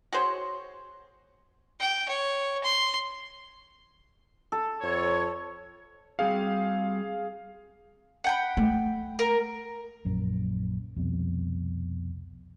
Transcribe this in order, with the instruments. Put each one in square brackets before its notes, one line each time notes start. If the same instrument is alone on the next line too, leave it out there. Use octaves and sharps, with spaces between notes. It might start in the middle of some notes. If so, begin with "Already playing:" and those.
[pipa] F#4 G#4 C5 C#5
[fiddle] G5
C#5
C6
[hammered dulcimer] A4
[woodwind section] F2 C#5
[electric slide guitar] G3 C4 F#4 [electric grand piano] G#4 F5
[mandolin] F#5 G5 B5
[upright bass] A3
[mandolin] A#4
[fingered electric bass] A#1 F#2
C2 F2 B2